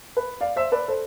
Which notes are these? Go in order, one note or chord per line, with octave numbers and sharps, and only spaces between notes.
B4
D5 F5
C5 E5
B4 D5
A4 C5